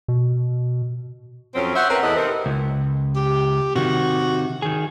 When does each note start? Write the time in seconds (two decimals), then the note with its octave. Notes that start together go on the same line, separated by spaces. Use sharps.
0.08 B2
1.55 F2 F#3 C4 C#4
1.76 C5 C#5 E5 F#5
1.89 C4 C#4 A#4 B4
2.02 E2 E3 A4 B4 D#5
2.17 C3 B3 C4 D#4 A#4
2.46 C#2
3.16 G4
3.75 C3 D#3 F#4
4.62 D#3 G#4